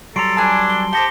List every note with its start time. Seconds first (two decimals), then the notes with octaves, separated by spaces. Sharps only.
0.16 F#3 G3 A4 A#5 C6 C7 D7
0.37 D4 A4 B4 G#5 A5
0.70 G7
0.93 G4 C5 D#5 A5 A#6 C#7 G7